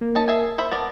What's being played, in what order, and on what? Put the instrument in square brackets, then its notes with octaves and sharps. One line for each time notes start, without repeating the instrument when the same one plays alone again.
[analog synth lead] A#3
[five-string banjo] C#4 D#4 A5
G#4 E5 G#5
C5 E5 B5
[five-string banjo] B3 A#4 D5 [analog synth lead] A5